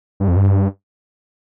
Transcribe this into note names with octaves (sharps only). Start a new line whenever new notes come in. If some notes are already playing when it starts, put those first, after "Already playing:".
G2
F2
G2